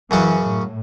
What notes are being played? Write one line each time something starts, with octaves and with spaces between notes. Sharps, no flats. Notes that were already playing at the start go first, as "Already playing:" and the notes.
F#2 C#3 E3 F#3 C#4
A2